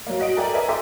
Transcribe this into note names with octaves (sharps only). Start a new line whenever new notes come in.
F#3 A#3
F#4 D#5 F#5 D7
A4 A#4 D5 E5 G5 G#5
A#4 B4 D#5 E5 G#5 A#5
A4 D#5 E5 G5 C6 D6